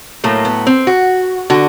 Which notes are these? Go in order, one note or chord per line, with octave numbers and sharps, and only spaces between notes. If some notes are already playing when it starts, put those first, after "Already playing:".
A2 F#3 A3 A#3
B3
C4
F#4
D3 F#4